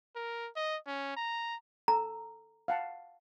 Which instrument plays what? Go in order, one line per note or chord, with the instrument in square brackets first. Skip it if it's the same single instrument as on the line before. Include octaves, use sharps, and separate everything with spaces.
[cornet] A#4
D#5
C#4
A#5
[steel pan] A4 [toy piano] A#5
[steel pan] F5 F#5 A5